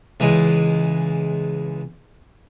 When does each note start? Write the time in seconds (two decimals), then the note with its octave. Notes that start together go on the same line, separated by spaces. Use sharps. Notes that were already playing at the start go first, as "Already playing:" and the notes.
0.20 C#2 E3 G#3